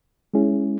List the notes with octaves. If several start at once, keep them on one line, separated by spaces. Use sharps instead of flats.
G#3 C#4 E4 G#4